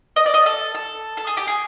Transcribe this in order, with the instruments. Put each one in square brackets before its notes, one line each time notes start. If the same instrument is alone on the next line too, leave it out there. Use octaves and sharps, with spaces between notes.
[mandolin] D#5
D5
D#5
A4
A4
A4
G#4
G4
G#4